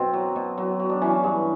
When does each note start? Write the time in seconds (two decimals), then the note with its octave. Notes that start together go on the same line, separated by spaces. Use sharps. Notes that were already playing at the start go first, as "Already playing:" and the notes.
Already playing: F#2 B2 C4
0.13 F#3
0.36 B2
0.58 F#3
0.80 F#3
0.90 D4
1.02 E3 C#4
1.24 G2